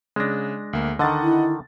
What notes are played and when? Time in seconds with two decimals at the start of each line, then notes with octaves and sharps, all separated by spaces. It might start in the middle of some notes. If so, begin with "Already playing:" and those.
0.16 C#3 G#3 D4 A#6
0.73 D2 A#3
0.99 D3 D#3 D#5 F#5 A6
1.22 E4